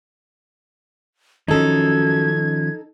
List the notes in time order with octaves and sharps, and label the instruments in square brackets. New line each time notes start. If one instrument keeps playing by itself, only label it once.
[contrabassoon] F#2 [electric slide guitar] D#3 F3 C#4 [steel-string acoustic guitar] D#4 A4 [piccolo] G#6